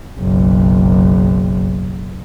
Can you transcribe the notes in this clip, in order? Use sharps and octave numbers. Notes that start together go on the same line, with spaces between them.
F#1 B1